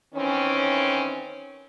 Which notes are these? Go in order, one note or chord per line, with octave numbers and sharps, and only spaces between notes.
D#3 E3 C4 C#4